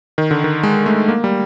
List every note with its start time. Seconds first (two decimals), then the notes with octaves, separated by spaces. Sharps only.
0.18 D#3
0.31 D3
0.44 D#3
0.63 G#3
0.86 A3
1.08 A#3
1.24 G3